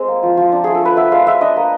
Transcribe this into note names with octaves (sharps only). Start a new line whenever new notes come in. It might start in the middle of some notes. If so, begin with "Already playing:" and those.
Already playing: G#3 C4
A#3
F3
F3
D4
A3 G#4
A4
A3 B4
B3 E5
G#3 F5
G#3 E5
D4 D#5
A#3